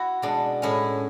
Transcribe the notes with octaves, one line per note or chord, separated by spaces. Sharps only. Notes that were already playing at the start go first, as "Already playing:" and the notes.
Already playing: E4 F#4
B2 G#3 D4
A2 G#3 C#4 E4